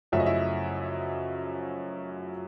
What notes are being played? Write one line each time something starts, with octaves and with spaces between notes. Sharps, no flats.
F#2 C#3 F3 A3 E5
D#5
E4 E5